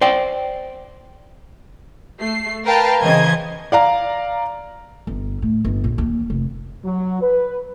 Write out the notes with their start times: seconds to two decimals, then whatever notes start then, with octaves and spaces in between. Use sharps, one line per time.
0.01 C5 D5 G5
2.19 A3 C7
2.64 A#4 B4 F5 G5 A5
3.01 C#3 E3 C5 D#5 G#6
3.72 D5 F5 A#5
5.07 G1
5.42 A2
5.65 G1
5.84 A#1
5.98 D#2
6.30 F1
6.84 F#3
7.21 B4